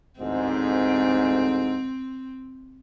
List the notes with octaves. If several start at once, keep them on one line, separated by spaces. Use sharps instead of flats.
A1 D2 G#2 C4